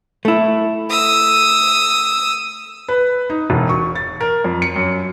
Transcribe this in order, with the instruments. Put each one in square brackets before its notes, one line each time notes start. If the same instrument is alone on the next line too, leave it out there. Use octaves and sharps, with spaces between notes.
[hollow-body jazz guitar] A3 E4
[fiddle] D#6 E6
[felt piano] B4
D#4
E1
C#6
A6
A#4
F2
C#7
F#2